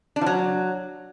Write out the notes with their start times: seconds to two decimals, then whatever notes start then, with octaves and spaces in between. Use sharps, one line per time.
0.16 D4
0.21 F3
0.26 F#3